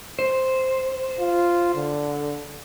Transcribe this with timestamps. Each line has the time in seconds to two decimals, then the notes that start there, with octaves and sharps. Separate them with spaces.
0.19 C5
1.20 F4
1.75 D3